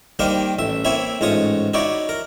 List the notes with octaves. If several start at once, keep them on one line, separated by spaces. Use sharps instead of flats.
D#3 G3 A#3 C5 F5 C6
A1 E5
A#3 C4 E4 C#5 E5
A1 G#2 F4 C#5 C#6 D#6
D#4 E4 F#4 C#5 D5
A#4